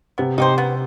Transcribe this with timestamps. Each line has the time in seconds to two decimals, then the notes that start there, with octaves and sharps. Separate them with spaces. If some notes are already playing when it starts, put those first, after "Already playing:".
0.18 C3 B3
0.38 C3 D#4 G4 C5
0.58 B3